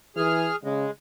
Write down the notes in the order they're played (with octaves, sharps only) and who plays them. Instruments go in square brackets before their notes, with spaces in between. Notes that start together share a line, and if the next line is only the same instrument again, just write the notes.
[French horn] E3 [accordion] G#4 F6
[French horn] C#3 [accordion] G#3